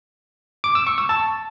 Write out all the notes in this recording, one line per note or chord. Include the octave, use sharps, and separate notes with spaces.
D6
E6
C#6
E6
A5